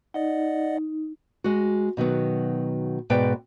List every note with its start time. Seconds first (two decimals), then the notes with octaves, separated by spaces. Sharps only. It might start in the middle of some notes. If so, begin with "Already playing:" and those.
0.14 D#4 D5 D#5 F#5
1.44 G#3 F#4
1.97 B2 D#3 F#3 B3
3.10 G#2 B2 B4 D5 G5